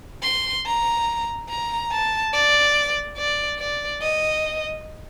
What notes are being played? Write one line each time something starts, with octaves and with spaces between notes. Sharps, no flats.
C6
A#5
A#5
A5
D5
D5
D5
D#5